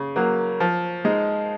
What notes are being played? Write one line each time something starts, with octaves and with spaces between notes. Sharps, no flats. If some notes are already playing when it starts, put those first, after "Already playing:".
Already playing: C#3
F#3 A#3
F3
G#3 D#4